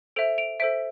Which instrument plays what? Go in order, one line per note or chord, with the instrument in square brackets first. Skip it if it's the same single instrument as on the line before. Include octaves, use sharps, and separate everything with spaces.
[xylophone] A4 C5 E5 D7 F7
D7 F7
A4 C5 E5 B6 D7